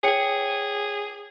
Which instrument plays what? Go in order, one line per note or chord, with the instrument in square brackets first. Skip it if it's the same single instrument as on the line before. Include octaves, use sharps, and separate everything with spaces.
[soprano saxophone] G#4 [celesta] C#5 G5 C#7